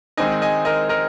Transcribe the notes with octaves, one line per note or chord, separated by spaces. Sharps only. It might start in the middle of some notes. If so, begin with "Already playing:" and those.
D#3 G#3 C4 D#4 D#5 G#5
D#5 G#5
A#4 D#5
A#4 D#5